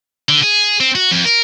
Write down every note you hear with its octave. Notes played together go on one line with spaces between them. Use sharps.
D3
G#4
C4
F#4
F2
A#4